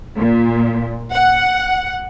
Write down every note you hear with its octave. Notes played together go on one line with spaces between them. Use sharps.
A#2
F#5